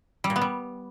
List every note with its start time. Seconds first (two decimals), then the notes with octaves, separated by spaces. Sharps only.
0.24 G3
0.30 A#2
0.36 B3
0.41 G3